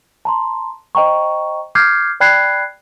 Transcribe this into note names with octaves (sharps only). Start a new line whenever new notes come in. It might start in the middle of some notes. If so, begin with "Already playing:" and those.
A5 A#5 C6
C5 D#5 G5 A#5 C#6
D6 F6 G6 G#6 C7
D5 G5 B5 F#6 G#6 C7